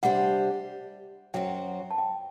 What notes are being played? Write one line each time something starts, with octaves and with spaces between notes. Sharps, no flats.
C3 G3 D4 G4 C5 F#5
F#2 F#3 C4 F#4 G5
A5
G5